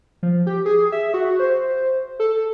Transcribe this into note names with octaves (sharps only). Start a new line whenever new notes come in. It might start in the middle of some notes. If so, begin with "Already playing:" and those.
F3
G4
G#4
E5
F#4
C5
A4